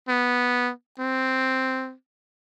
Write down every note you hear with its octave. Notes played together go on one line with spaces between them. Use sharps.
B3
C4